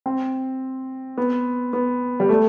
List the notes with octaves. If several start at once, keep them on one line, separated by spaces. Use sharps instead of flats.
C4
B3
B3
G3
A3